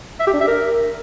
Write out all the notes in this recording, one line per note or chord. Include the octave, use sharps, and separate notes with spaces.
E5
G4
D4
E5
A#4